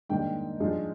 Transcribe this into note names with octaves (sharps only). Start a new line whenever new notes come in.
G#2 D#3 A#3 D4 G5
G#2 F3 G#3 D4 F4